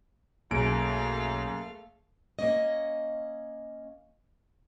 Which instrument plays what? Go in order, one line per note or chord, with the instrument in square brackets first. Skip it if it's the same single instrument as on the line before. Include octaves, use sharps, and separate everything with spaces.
[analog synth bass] B1 [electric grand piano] F#2 D7 [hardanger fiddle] A3 F5 [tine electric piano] A#3 G#4
[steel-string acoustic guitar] A#3 C#4 D#5